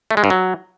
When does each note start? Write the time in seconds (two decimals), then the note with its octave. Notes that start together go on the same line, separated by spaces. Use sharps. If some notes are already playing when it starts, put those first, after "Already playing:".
0.11 A3
0.17 G#3
0.24 G2
0.30 F#3